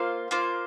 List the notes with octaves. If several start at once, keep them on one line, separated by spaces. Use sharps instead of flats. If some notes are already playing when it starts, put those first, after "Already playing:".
Already playing: A#3 F4 C5 F5
A#3 F4 C5